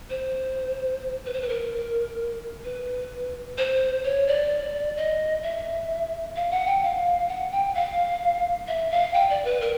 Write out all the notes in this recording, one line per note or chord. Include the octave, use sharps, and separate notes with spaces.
C5
B4
C5
B4
A#4
B4
C5
C#5
D5
D#5
E5
F5
F#5
G5
F5
F#5
G5
F5
E5
F5
G5
D5
B4
A#4